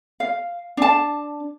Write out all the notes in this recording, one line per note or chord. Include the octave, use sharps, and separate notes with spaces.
F5
D4 A5